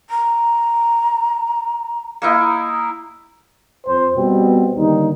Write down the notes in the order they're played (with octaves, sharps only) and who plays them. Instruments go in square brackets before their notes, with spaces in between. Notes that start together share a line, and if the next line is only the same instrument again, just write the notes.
[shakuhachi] A#5
[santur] A#3 D#4 E4
[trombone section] F2 C5
B2 G3 B3 C4
D#2 D3 G3 D#4